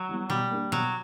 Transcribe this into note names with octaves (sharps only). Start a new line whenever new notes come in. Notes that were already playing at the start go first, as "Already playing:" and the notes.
Already playing: F#3
E3 G3 B3
B2 G3
A#3 D4 G4
B2 F#3